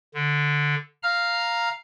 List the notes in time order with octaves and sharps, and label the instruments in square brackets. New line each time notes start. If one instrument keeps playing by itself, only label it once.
[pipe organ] D3
F5 A#5 F6